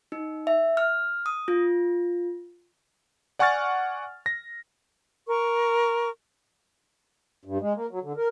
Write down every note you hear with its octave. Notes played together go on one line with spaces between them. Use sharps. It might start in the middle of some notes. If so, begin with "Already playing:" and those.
D#4
E5
F6
D#6
F4
D5 F#5 G#5 C#6 F6 A6
A#6
A#4 C#6
G2
G#3
A#3
F#3
D3
A#4